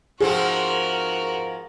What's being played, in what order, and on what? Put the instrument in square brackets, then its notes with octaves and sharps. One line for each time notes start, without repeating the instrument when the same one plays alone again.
[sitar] G#2 F3 C4 [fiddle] F#4 A#4 [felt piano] G#4